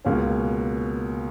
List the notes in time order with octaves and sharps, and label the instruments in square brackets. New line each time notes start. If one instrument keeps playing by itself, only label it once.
[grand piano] C#2 B2 A#3 C#4